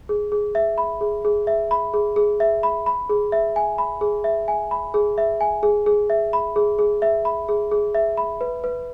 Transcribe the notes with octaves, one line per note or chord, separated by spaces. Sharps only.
G#4
G#4
E5
B5
G#4
G#4
E5
B5
G#4
G#4
E5
B5
B5
G#4
E5
G#5
B5
G#4
E5
G#5
B5
G#4
E5
G#5
G#4
G#4
E5
B5
G#4
G#4
E5
B5
G#4
G#4
E5
B5
B4
B4